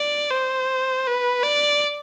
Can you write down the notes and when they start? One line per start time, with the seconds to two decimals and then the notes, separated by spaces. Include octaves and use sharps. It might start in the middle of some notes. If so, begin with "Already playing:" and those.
Already playing: D5
0.31 C5
1.07 B4
1.44 D5